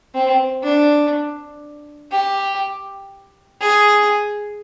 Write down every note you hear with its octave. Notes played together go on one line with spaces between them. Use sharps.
C4
D4
G4
G#4